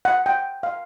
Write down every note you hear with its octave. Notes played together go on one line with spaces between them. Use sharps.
F#5
G5
F5